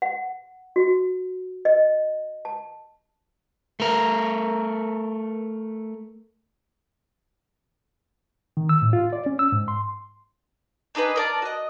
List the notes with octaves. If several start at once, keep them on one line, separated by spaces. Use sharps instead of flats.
F#5
F#4
D#5
A5
A3 A#4
D#3
E6
A2
F4
D5
C#4
E6
G#2
C6
D4 D#4 G#4 B4
A#4 D5 A5
F#4 D#5